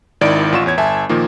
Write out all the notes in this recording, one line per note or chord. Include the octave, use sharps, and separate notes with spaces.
G#1 D#3 E4 D5 D7
A1 F4 F#5 C#6 E7
E2 C#5 G#6
G1 E5 G#5 A5
A#2 D#3 F3 A#3